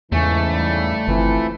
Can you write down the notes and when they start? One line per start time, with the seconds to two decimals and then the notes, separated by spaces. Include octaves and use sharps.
0.12 E2 G#2 C#3 E3 A3 C#4
0.50 G3
1.08 G1 E3 F3 C4 E4